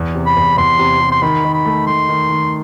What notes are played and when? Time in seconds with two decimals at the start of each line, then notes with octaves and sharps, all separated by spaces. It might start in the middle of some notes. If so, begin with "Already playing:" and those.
Already playing: E2
0.15 C3
0.26 B5
0.36 E2
0.57 E2 C6
0.79 C3
1.00 C3
1.12 C6
1.22 D#3 B5
1.45 D#3
1.54 B5
1.65 A3
1.87 A3 C6
2.09 D#3
2.29 D#3